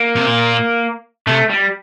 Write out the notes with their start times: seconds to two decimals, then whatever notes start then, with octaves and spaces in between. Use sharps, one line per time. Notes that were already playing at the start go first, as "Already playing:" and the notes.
Already playing: A#3
0.16 C3
0.26 A#2
1.27 C3 A3
1.50 G3